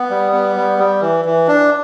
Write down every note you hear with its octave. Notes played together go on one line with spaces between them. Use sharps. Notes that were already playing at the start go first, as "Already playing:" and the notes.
Already playing: B3
G3
B3
G3
G3
E3
E3
D4